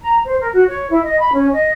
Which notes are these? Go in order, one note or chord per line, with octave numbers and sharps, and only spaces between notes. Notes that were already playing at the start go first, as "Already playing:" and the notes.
A#5
C5
A#4
F#4
C#5
E4
D#5
B5
C#4
D#5